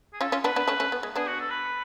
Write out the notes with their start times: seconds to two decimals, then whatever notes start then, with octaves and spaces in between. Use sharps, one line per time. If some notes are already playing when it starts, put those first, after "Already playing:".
0.13 G#4
0.21 C#4 F4 A4
0.32 C#4 F4
0.44 B3 D4 B4
0.56 B3 D4
0.68 A3 C#4
0.80 A3 C#4
0.92 B3
1.03 G#3
1.16 B3 D4 G#4
1.27 F#4
1.40 A4
1.50 B4